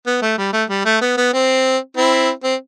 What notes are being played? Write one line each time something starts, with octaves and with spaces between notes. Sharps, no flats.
B3
A3
G3
A3
G3
A3
B3
B3
C4
C4 E4
C4